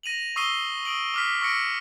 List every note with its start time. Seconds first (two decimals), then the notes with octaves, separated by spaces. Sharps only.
0.03 A#6 D#7 F7 F#7
0.36 C#6 D#6 E6 C7 D#7 G7
0.85 D#6 D7 F#7
1.14 D6 F6 B6
1.41 C#6 E6 A#6 C#7 D7